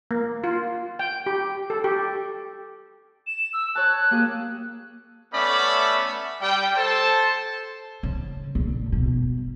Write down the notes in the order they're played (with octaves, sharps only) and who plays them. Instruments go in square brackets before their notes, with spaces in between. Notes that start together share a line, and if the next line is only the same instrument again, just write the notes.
[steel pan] A#3
F4
G5
G4
A4
G4
[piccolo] E7
E6
[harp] C#5 A5 [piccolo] F#6
[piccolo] F#6
[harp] A#3 G4 G#4
[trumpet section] A3 B3 C#4 D5 E5 B5
G3 G5
A4 C5 A5
[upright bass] C#3
A#1
B2